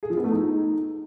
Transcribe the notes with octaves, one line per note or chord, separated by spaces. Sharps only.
G#4
F3
B3
A3
D#4